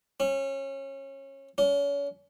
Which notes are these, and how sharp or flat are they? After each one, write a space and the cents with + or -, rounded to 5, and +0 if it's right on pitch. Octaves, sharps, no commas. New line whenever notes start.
C#4 -25
C#4 +35